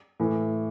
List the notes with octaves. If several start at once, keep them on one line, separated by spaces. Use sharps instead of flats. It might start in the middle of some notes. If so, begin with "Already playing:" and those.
A2 E3